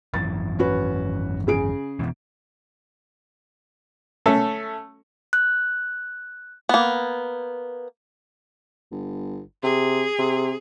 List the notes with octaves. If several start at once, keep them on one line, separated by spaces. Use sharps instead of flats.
G#1 F#2 E3 A6
C#4 F#4 B4
C#3 G#4 D7
F1 B2 E3
A3 C#4 A4
F#6
A#3 B3
G1
C3 G#4
C3